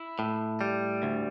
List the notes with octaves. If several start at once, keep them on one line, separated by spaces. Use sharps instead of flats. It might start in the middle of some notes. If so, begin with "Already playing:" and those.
Already playing: E4
A2
G3
D2